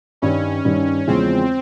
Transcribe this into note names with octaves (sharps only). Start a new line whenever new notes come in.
G2 D#3 G3 C#4
G2 D#3 G3
E2 C#3 F3 G#3 C4